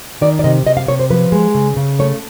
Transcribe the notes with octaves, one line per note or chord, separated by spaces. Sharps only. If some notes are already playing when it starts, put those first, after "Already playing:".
D#3 D5
D5
C3 D#5
C3 D#5
F5
C3 C#5
C5
F3 B4
G#3
C#3
C#3
A3 C#5